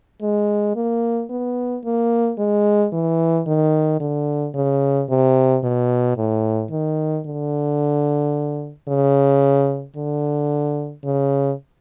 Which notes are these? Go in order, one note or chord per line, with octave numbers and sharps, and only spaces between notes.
G#3
A#3
B3
A#3
G#3
E3
D#3
D3
C#3
C3
B2
A2
D#3
D3
C#3
D3
C#3